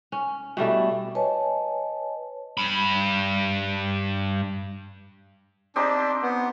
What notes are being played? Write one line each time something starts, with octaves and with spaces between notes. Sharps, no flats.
C#4
B2 G3 A3 E4
B4 C#5 D#5 G#5 A5
G2 B5
C4 D4 D#4 G4
B3